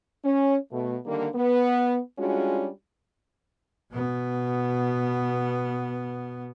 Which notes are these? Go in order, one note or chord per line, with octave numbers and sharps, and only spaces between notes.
C#4
B2 A3
D3 D#3 G3 A#3
B3
G3 G#3 C#4 D4 F4 F#4
B2 B3